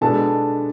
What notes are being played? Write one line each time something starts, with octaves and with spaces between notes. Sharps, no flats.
B2 G#3 B3 D4 A4 A5